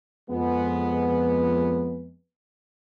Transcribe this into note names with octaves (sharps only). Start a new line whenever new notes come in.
F2 G#3 B3